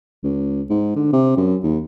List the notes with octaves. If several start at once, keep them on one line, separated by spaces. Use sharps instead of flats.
C#2
G#2
D3
C3
F#2
D#2